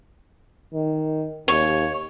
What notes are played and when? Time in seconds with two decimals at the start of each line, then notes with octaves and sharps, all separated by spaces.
0.74 D#3
1.48 D#2 C#5